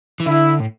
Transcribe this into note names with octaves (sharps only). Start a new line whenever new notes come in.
E3
D3 E4
A2